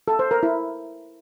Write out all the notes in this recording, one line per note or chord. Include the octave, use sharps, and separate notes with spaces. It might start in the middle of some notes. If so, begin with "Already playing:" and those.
A4
C5
A#4
E4